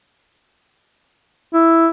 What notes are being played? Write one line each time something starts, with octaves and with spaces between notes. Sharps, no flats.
E4